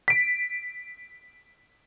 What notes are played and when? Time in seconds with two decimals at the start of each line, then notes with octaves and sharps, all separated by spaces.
0.08 B6 D7